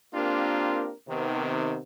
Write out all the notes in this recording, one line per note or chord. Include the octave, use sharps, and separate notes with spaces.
A#3 C4 D4 F4 G4 A#4
C3 D#3 B3